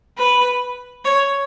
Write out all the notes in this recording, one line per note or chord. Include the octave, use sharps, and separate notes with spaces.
B4
C#5